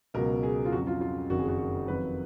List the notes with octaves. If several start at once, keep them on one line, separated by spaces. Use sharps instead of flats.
C#2 B2 F#3 A#4
G#4
F4
F2 C#3 F#3 F#4
F4
F4
F#1 F2 D#3 F#4
G#4
F#4
F#4
F2 D#3 F#3 B4